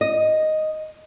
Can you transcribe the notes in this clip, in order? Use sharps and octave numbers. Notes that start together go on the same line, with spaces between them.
D#5